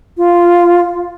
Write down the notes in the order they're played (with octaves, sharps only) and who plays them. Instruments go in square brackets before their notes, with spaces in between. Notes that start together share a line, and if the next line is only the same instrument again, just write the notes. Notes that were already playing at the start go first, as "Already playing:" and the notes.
[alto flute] F4